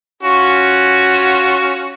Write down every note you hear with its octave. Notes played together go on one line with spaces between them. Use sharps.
C#4 F4 F#4